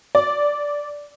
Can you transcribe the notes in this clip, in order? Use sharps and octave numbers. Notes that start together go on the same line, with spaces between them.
D5